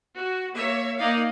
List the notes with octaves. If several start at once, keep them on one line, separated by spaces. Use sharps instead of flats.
F#4
A#3 C#5 E5
A#3 D#4 D5 F5